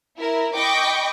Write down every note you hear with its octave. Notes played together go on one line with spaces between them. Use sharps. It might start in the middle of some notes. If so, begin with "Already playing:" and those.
E4 A#4
D#5 G5 B5 C#6 D6